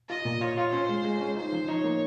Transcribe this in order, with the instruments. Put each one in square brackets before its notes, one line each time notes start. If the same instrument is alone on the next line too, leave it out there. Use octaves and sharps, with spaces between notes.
[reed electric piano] F4 [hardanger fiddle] D#5
[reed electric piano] A#2
[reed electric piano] F4 [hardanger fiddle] C#5
[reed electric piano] F4
[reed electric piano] C#4 [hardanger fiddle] C5
[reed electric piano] G#3
G#3
C#4
[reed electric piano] D#4 [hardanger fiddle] C5
[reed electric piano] F3
[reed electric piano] D#4 [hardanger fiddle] C#5
[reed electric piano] A#3